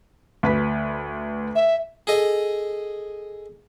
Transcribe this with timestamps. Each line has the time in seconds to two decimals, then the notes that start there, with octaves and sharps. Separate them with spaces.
0.43 D2 B4 B6
1.55 E5
2.07 G#4 A4 D#5